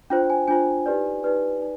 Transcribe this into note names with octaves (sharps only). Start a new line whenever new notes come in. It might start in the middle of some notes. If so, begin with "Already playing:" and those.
D4 F4 C5 G5
G#5
D4 F4 C5 G#5
D#4 G4 B4 D5
D#4 G4 B4 D5
D#4 B4 D5